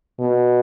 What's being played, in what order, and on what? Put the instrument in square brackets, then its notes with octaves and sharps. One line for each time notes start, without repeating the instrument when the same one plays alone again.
[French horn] B2